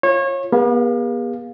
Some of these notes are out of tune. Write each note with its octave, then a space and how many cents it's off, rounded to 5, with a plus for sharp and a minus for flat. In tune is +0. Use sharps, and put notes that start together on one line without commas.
F4 +0 C#5 -30
B3 -40 G#4 -35 F5 +10